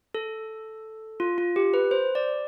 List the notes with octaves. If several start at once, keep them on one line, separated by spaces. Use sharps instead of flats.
A4
F4
F4
G4
B4
C5
D5